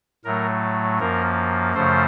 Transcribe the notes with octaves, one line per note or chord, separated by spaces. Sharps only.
A2 F#3 A3 A#4
F#2 F3 A#3 A#4
F#2 C#3 F3 A3 C5